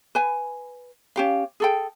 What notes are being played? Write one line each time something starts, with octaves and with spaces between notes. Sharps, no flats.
B4 G#5
C#4 G4 F5
G#4 A4 G5